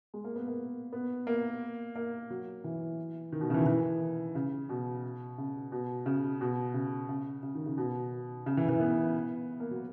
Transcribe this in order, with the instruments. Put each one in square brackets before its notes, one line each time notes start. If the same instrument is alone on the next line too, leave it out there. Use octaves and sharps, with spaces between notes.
[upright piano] G#3
A#3
B3
A#3
B3
A#3
A#3
F#3
E3
D#3
B2
C#3
E3
D#3
E3
C#3
B2
C#3
B2
C#3
B2
C#3
C#3
C#3
D#3
C#3
B2
C#3
E3
E3
B3
A#3
F#3